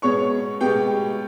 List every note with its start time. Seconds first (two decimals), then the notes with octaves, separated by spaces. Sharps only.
0.02 B2 G#3 B3 C#5 C#6
0.61 B2 G#3 B3 G4 G5